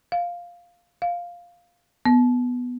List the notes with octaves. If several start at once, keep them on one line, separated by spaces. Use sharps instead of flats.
F5
F5
B3